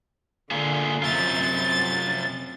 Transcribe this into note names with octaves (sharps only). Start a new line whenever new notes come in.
D3 A#3 F4 G#4
F#2 C3 C4 F4 A6